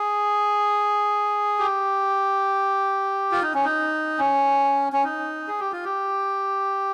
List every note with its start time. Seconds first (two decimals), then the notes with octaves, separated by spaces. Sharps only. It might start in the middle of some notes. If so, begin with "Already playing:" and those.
Already playing: G#4
1.59 G4
3.32 F4
3.42 D#4
3.54 C#4
3.64 D#4
4.18 C#4
4.93 C#4
5.04 D#4
5.48 G#4
5.60 G4
5.72 F4
5.85 G4